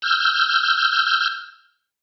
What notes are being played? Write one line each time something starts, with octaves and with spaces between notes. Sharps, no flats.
E6 F6 G6